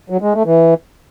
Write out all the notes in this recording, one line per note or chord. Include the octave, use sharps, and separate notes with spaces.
F#3
G#3
A3
E3